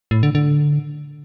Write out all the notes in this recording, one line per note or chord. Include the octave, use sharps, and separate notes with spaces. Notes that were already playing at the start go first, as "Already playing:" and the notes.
A2
D3
D3